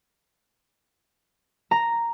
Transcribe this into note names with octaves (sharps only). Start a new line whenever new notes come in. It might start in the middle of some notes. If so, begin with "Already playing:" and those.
A#5